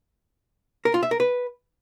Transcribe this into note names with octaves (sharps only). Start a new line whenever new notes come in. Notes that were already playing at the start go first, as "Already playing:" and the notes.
A#4
F4
E5
A#4
B4